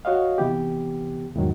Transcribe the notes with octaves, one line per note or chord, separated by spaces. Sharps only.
F#4 C#5 D#5 F5
C3 E3 B3 G4
E2 G#2 D#3 F#3